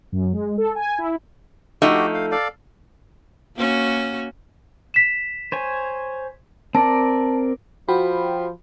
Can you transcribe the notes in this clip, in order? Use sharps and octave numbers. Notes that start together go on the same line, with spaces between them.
F#2
G#3
A4
G#5
E4
F3 A3 D#4 F#4 G4
F5
A4 D5 F5
A#3 C#4 F#4
B6 E7
C5 C#5 G#5
C4 A#4 D5 A5
F3 F#4 G5 B5